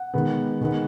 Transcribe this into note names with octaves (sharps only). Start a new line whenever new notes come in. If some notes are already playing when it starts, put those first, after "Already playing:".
Already playing: F#5
D#3 G#3 B3
D#3 G#3 B3